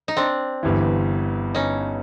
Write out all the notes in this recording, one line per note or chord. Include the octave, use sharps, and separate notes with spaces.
D#4
C4 D4
G1 G2 E3
C#4 D#4